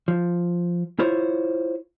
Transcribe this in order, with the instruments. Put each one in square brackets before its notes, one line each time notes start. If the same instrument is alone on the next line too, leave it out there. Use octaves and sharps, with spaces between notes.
[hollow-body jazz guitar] F3
E4 F4 C5 C#5